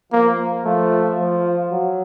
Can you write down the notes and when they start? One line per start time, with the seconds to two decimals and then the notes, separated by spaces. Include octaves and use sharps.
0.12 F3 A#3
0.65 F3 A3
1.19 F3
1.71 F#3